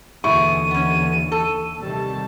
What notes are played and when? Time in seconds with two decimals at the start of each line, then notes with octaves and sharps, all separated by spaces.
0.24 D#2 B2 D3 E3 E4 G#4 C#6 D#7
0.71 B3 C#4
1.32 A4
1.80 C3 D#3 G3 A5